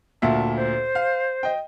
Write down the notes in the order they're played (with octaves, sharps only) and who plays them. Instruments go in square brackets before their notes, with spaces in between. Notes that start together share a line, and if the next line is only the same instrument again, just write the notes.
[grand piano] D2 A#2 E5 [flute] A5
[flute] C5
[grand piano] F5
D#5 G5